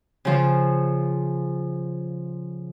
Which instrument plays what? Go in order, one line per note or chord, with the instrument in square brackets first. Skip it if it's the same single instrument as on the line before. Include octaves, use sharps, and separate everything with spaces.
[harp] C#3 F3